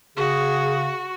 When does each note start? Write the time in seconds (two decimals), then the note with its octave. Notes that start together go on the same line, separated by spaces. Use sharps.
0.17 C#3 F#4 G#4